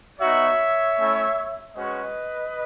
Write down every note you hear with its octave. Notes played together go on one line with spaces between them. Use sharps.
B3 D#4 F#4 C#5 E5
A3 C#4 E4
G#3 C#4 F#4 B4 D#5